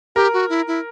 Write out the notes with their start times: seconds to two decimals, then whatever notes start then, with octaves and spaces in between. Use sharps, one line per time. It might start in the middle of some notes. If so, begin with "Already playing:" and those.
0.16 G4 A#4
0.34 F#4
0.49 E4
0.67 E4